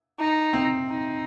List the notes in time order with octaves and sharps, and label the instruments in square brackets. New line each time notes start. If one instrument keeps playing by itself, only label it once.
[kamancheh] D#4
[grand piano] C4
[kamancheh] D#4